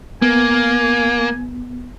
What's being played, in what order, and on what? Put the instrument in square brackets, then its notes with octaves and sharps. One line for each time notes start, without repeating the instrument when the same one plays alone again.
[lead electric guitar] A#3 [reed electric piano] B3 [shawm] G#5